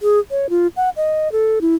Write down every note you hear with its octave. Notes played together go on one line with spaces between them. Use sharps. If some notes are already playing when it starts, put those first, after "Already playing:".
G#4
C#5
F4
F#5
D#5
A4
E4